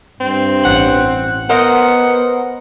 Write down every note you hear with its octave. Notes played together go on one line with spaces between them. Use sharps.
G2 C4
A1 F#5 F#6
B3 A#4 C5 D#5 F#5